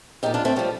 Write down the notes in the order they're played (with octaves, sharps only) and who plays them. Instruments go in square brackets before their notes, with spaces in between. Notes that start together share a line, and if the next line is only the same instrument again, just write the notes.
[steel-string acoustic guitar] A#2 F3 D#4 G4
D4 F4
A3 C4
A2 F3 G3